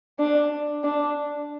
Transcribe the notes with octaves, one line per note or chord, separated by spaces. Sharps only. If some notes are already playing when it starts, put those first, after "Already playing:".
D4
D4